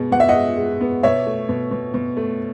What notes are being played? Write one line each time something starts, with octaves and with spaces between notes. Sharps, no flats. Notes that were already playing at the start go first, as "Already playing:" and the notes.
Already playing: B2 G#3 B3
B2 F#5
E5
D#5 F#5
G#3
G#3
B3
B2 C#5 E5
A3
B2
B2
B2
A3